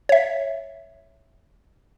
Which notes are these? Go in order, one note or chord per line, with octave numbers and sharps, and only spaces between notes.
C#5 E5